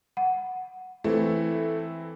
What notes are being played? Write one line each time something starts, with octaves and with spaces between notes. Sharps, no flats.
F#5
E3 A3 C4 E4